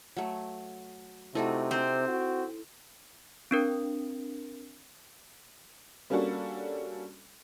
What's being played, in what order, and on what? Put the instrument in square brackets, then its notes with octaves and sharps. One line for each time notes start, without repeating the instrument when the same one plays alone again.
[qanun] F#3 A3
[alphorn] C3 [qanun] A3 D#4 F#4 [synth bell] E4 A4
[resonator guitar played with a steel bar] C4 [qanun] G#5
[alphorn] F#4
[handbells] C4 D4 A#4
[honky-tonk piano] G3 A#3 C#4 D4 F#4 A4